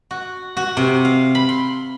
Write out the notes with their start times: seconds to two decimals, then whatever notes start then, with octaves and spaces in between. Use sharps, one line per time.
0.11 F#4
0.57 F#4
0.77 C3
1.05 F5
1.35 B5
1.49 C6